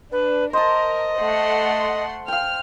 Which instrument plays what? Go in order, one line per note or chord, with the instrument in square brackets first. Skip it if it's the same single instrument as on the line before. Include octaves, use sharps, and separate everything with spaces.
[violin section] D4 [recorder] B4
[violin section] A#4 [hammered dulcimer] C5 A5 [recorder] D#5
[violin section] A3 F#5 C6
[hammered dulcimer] F5 G5 [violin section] F6